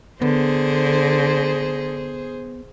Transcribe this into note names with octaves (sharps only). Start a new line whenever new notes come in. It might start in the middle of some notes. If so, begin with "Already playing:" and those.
D3 B3 G#4 C5